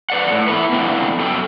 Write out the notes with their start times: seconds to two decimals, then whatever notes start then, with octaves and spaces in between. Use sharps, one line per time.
0.10 B4 D5 F#5
0.31 A2
0.48 B3 E4 B4
0.73 F2 D3 B3 E4 G5
1.20 F#2 A4 G5